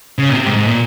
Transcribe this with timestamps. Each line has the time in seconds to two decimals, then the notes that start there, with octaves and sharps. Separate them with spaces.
0.18 C#3
0.29 A#2
0.33 C3
0.45 G#2
0.56 G#2
0.67 A#2